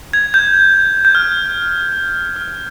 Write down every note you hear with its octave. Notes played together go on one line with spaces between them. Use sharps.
G#6
G6
G6
F6
F6